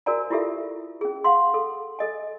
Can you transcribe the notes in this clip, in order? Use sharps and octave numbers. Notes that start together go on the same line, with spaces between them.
F#4 A#4 C5 D5 G#5 A#5
E4 F4 G4 A4 E5
C#4 G#4
F5 F#5 C6
A4
A4 D#5 G#5